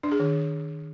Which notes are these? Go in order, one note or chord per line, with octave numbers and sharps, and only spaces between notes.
D4
G#4
D#3